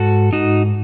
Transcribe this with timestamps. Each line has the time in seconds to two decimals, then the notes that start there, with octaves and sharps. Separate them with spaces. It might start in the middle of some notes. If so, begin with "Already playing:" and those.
Already playing: G#2 F#4 A4
0.33 G#2 D#4 F#4